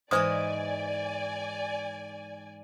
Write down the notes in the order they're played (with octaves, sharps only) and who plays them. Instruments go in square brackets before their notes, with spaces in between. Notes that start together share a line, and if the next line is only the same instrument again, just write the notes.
[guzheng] G#2 E3 D#5 [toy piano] C5 D#6 [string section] D5 G#5